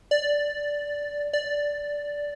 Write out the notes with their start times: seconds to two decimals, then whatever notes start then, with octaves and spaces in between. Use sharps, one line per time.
0.11 D5
1.33 D5